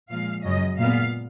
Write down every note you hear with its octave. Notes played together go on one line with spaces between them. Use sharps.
A#2 F3 G#3 F5
F#2 C#3 F#3 D#5
A#2 G#3 B3 F5